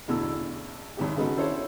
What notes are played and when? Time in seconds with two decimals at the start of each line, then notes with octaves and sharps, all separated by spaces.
0.08 A1 E2 B2 D3 E6
0.97 G#1 D#2 G#2 C3 G4
1.16 C#3 G#3 B3 D#4 F#4 A4
1.36 D4 E4 A4 C5 C#5